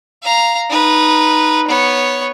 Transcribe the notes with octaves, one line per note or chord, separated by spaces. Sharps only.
F5 A#5
D#4 B4
B3 C#5